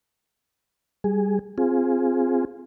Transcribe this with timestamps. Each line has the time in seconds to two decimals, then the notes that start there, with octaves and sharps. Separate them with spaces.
1.04 G3 G#4
1.58 C4 F4 G#4